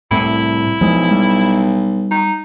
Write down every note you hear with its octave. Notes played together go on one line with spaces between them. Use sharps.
C2 A2 E4
B1 F3 G#3
G3
D#4